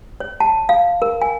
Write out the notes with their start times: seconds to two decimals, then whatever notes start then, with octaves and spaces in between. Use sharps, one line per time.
0.20 C#5
0.40 A5
0.69 F5
1.02 A#4
1.22 G#5